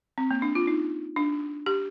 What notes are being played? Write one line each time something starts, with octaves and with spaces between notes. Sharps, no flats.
C4
A#3
D4
F4
D#4
D4
G4